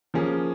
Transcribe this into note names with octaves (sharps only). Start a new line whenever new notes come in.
F3 A#3 C#4 G#4